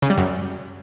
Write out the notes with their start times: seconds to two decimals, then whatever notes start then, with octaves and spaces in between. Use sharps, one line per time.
0.02 C#3
0.10 G3
0.18 F#2